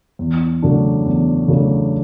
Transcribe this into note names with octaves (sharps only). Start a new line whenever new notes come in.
E2
C#3 F#3 A3 D4
E2
C#3 F#3 A3 D4